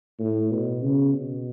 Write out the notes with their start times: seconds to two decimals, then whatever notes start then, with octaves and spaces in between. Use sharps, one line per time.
0.19 A2
0.51 B2
0.83 C#3
1.14 B2